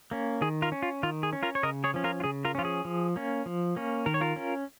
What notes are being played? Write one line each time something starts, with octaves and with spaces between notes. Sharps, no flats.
A#3 C#4
D#3 G#4
F4 A#4
C#4
F4
D#3 F4
G#4
C#4
F4 A#4
C#5
C#3 A#4 D#5
G#4 C#5
F3 C#4
F4 A#4
F4
C#3 G#4
F4 A#4
F3 C#4 F4
G#4
F3
A#3 C#4
F3
A#3 C#4
D#3 A#4
C#5
F4 A#4
C#4